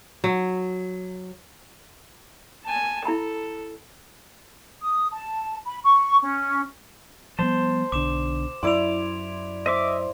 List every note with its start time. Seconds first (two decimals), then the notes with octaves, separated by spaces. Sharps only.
0.24 F#3
2.64 G#5 A5
3.05 E4 A4 A#5 B5
4.82 D#6
5.12 A5
5.64 B5
5.84 C#6
6.22 C#4
7.39 F3 G3 B3 C5 A5
7.92 B1 D3 D6 E7
8.63 F#2 E4 D5 C6 D6 D7 F7
9.66 C5 D#5 E5 D6